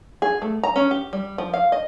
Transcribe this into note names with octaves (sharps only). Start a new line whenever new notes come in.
G#4
A3
A#5
C#4
G4
G3
F3
F5
D#5